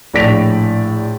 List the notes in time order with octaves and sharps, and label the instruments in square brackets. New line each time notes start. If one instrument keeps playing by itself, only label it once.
[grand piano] A#1 A2 D5 B6 D7 F7